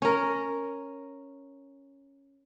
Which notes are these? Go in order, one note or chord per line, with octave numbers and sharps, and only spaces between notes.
C#4 A#4